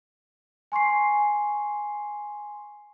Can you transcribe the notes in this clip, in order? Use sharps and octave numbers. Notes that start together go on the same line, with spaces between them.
G#5 C6 C#6 C7